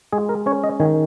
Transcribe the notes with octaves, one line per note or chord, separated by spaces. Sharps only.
G#3 G#4
A#4
C#4 C#5
D#5
D#3 G#5